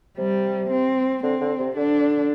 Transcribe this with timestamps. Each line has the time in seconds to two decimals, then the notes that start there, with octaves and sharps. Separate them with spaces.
0.18 C3 G3
0.71 C4
1.23 D3 C4
1.41 D3
1.59 C3
1.77 D3 D4